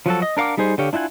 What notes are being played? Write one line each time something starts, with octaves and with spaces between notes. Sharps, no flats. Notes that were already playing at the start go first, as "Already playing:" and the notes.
F3 F#3 F#4 A4
D#5
D4 A#4 F5 F#5 D6
G3 D#4 G#4 C5
D3 G4 C#5 F5
D4 E4 F4 F#5 G#5